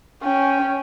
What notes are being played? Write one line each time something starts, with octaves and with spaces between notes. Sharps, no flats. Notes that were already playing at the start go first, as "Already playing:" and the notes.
C#4 G5